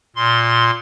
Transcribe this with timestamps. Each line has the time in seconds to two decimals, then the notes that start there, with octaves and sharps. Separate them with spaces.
0.16 A#2 C6